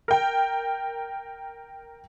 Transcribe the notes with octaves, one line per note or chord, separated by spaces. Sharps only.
A#4 G5